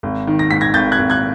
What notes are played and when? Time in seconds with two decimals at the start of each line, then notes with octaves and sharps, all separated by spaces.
0.03 G#1
0.27 D#3
0.39 A#6
0.51 G#2 B6
0.61 G#6 A#6
0.74 G#1 G6 A6
0.92 F#6 G#6
0.99 G#1
1.10 F#6 G#6